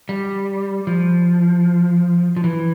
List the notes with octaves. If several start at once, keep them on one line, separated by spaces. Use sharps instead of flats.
G3
F3
F3
E3